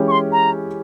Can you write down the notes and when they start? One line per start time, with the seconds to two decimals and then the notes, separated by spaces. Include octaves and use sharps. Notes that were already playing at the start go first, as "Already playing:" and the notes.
Already playing: E3 G#3 C#4 E4 G4
0.08 C#6
0.11 C6
0.32 A#5